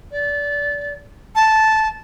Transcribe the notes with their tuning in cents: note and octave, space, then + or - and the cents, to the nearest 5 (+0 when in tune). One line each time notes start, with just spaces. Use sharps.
D5 -25
A5 -10